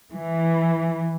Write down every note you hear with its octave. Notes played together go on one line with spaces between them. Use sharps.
E3